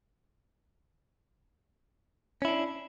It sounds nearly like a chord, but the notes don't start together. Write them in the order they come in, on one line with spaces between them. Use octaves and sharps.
C#4 E4 D4